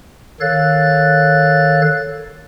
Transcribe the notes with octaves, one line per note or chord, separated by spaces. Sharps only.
D#3 A4 C#5 F5 F#6 A6